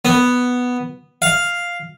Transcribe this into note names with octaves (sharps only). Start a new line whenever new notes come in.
B3
F5